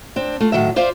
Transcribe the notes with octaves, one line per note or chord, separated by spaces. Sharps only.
C4 D4
A3 F4
A2 D#3 F#3 E5
F4 C5 D5 E5 F5